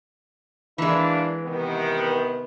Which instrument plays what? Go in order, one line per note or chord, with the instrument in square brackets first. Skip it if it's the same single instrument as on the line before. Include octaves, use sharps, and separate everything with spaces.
[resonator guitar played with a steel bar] E3 G#3 [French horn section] A#3 D4 E4
[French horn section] C3 D#3 B3